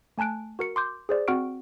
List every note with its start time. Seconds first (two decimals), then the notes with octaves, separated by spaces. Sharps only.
0.18 A3 G#5 A5 F#6 D7
0.59 F#4 A#4 C#7
0.76 C6 D6 G6
1.09 G#4 C5 D5
1.28 C4 F#4 F#5 C#6 F6 D7